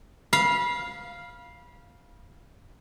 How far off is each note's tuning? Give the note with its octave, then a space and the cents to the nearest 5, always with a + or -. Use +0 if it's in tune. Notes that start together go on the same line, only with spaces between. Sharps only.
F5 +0 B5 -25